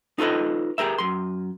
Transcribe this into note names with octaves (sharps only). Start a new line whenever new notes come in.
D#4 F4 A4 B4 D#5
G4 G#4 A#4 E5
F#2 C6